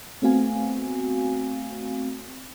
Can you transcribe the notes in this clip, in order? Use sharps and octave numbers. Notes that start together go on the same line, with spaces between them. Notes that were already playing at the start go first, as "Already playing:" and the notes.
A3 B3 C4 F#4 F5 G#5